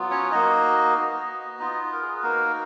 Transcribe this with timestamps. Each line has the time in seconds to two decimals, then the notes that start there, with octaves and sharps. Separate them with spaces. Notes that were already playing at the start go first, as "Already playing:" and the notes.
Already playing: F#3 B3 F4
0.11 C#4 C#5
0.31 A#3 D#4 F#4 D#5
0.95 B3 F#4
1.59 B3 D#4 F4 D#5
1.93 A#4
2.02 G#4
2.16 B4
2.23 A#3 D#4 F#4 A#4